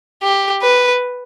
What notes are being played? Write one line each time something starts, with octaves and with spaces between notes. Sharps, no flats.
G4
B4